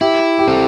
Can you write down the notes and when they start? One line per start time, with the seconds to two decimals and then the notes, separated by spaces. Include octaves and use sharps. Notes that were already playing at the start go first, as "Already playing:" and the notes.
0.01 E4 G4
0.39 G4
0.47 C4 A4